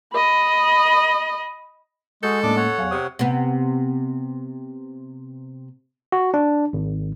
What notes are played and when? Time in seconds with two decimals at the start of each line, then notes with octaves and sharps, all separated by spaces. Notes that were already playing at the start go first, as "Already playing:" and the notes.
0.13 D#5 B5
2.23 G#3 F#4 G#4 A4 G6
2.43 A2 A#3 C#4 D4 D6
2.57 C#5 F#5
2.78 E2 F#3 F5 G#5
2.91 C3 C#6 D#6
3.19 C3 B3
6.12 F#4
6.34 D4
6.73 G#1